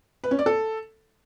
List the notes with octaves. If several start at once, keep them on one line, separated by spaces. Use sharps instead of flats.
B4
C#4
D5
A4